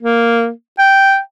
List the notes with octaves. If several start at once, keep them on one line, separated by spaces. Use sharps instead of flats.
A#3
G5